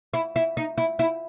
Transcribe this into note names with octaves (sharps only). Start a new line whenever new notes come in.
E4
E4
D#4
E4
E4